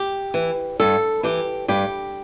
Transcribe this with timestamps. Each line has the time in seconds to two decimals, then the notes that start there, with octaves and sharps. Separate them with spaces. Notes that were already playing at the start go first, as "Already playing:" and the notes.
Already playing: G4
0.34 E3
0.80 G2 A4
1.23 E3 G4
1.68 G2 G4